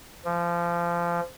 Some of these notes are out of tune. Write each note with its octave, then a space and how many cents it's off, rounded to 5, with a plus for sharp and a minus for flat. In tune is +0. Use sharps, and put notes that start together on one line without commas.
F3 -25